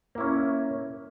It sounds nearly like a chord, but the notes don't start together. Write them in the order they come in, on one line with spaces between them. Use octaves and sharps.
A#3 E4 C#4